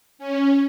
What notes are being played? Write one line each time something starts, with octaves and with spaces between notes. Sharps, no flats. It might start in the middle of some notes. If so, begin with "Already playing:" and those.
C#4